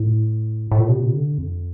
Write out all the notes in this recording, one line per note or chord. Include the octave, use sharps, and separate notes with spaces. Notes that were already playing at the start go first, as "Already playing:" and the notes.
Already playing: A2
A2
A#2
C3
A#2
C3
D3
F2